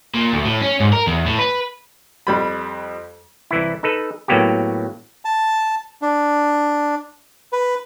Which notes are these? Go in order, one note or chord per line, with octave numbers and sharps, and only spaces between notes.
A#2
D2
A2
C#4
G#2
A#4
E2
A2
B4
F2 G3 B5
C2 E3 E4
D#4 A4 B4
A2 F#3 A#3 B3 F#4 G4
A5
D4
B4